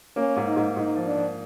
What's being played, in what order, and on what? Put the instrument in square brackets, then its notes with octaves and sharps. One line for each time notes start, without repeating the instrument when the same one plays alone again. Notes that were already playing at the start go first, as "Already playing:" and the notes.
[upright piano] A#3 [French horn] C#4
[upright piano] G#2
[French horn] D#4
[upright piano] G#2
[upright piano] G#2 [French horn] D#4
[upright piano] F3
[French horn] D4
[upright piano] F3